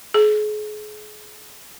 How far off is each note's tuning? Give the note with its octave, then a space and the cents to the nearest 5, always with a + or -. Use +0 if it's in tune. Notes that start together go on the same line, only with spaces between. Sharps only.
G#4 +35